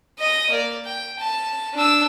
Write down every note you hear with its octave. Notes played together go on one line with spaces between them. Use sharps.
D#5 D#6
A#3 D5
G5
A5
D4 E6